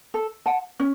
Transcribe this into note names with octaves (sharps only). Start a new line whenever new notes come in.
A4
F#5 A5
C#4